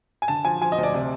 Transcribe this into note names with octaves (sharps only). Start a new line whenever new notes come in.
G#5
D3 A5
F3 G#5
F3 G#5
D#5
D2
D5
C3